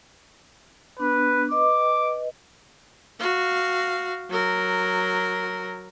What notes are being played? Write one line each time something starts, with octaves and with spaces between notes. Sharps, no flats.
B3 D4 B4
B4 D#5 D6
F#4 F5
F#3 A#4